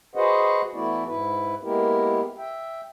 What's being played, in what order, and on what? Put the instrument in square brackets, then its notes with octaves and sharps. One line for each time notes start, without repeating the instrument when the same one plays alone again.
[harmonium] F#4 G#4 B4 C5 D#5 F#5
E3 A3 B3 E4 F#4 D5
G#2 E4 B4
G#3 A#3 B3 E4 G4 A#4
E5 G5